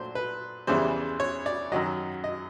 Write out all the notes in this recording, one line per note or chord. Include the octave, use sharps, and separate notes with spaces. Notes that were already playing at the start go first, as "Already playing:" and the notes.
Already playing: A#2 F#3 A3 D4 C5
B4
E2 C#3 E3 G3 C5
C#5
D5
F#2 D#3 F#3 D#5
D#5